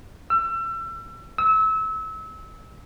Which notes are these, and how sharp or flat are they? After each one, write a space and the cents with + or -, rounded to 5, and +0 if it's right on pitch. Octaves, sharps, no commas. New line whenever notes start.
E6 +35
E6 -25